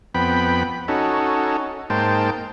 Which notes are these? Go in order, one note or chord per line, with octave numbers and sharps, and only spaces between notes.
F2 B3 G5 B5
C#4 D#4 F#4 A4
G#2 A#3 C5 G5 A5